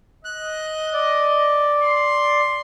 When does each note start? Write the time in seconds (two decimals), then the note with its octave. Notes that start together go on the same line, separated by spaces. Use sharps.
0.25 D#5 F#6
0.93 D5
1.83 C6